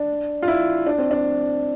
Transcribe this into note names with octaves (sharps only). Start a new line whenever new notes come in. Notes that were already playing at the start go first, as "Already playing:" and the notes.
Already playing: D4
F4
E4
D4
C4
D4